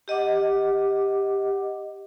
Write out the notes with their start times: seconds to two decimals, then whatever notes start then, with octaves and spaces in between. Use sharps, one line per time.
0.08 G4 D#5 F#5 D6